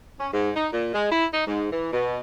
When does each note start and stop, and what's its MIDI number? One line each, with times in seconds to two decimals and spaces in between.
0.19 0.28 61
0.33 0.51 44
0.56 0.67 63
0.73 0.94 46
0.94 1.09 56
1.12 1.26 64
1.34 1.46 63
1.47 1.67 44
1.71 1.89 52
1.93 2.19 47